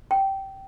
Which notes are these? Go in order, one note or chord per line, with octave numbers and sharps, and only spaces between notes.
G5